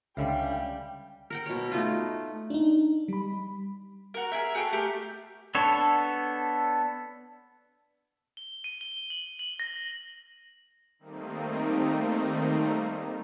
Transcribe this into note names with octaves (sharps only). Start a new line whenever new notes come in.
C#2 D3 G3 C#4 E5 F5 G5
A#4 F#5 G5
B2 C#5
A3 D#4 F4
D4 D#4
G3 B5
F#4 A#4
G#4 A#4 E5
F#4 G#4 A4 G5
A3 G4 A#4
B3 D4 A4 C#5
G7
D#7
G7
F#7
F#7
A#6
D#3 G3 A3 A#3 C4 D#4